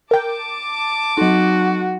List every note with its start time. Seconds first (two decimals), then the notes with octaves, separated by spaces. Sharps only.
0.11 A#4 G5 A5 D6
1.17 F#3 D#4 F#4